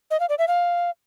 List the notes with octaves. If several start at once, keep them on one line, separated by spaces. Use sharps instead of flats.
D#5
F5
D5
E5
F5